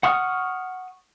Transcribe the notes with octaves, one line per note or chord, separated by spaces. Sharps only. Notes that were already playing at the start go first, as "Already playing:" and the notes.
F#5 C#6 D#6 F6